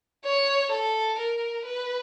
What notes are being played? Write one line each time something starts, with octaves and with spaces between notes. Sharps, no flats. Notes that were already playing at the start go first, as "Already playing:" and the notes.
C#5
A4
A#4
B4